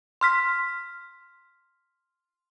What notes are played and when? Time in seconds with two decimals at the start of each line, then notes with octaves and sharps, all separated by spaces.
0.21 C6 F6 B6